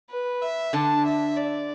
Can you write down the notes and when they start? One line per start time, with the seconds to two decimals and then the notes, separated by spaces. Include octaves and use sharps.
0.10 B4
0.42 E5
0.73 D3 D4 A5
1.05 E5
1.37 D5